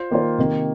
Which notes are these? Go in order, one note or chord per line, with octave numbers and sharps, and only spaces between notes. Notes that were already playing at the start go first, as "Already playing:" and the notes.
Already playing: F4 C5
D#3 A#3 F4 C5
C3 D#3 A#3